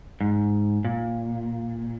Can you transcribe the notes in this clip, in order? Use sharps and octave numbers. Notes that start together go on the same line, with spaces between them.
G#2
A#2